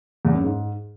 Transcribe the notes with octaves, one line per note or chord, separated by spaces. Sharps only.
E2
F#2
G#2